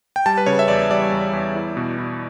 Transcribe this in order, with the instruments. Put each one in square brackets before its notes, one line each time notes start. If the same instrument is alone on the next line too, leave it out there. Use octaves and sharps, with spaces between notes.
[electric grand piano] G5
G3 A5
B4
C#3 C#5
E5
E2 D5
G3 D5
E2
E2
E4
B2
E4